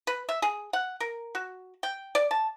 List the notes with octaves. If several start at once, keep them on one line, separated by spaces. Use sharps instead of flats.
B4
E5
G#4
F#5
A#4
F#4
G5
D5
A5